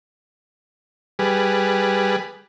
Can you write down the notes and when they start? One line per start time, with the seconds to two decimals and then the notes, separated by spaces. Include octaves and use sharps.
1.19 G3 G#4 B4